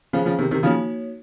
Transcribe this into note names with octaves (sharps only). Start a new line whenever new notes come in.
C#3 F3 C#4 G#4 C5
C#3 F3
C3 D#3
C3 D#3
C#3 F3 A#3 D#4 F#4 C#5